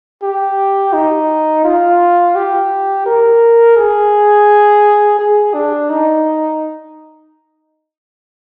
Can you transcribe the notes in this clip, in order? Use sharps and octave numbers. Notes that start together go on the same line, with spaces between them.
G4
D#4
F4
G4
A#4
G#4
G#4
D4
D#4